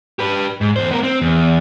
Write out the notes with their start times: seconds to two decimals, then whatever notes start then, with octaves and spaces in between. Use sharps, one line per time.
0.19 G4 B4
0.61 G#2
0.76 E2 C5
0.91 B3 A#4
1.03 C4
1.21 E2